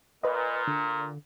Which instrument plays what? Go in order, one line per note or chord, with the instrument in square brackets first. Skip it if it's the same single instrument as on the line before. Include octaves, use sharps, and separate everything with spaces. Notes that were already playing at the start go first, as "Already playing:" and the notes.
[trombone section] A#2 [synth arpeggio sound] B4 D#5
[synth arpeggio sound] D3